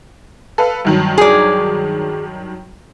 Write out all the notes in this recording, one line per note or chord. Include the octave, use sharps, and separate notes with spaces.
A4 B4 F5
G2 D#3 F#3
G#4 D5